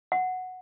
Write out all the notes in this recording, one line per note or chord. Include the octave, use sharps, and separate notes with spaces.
F#5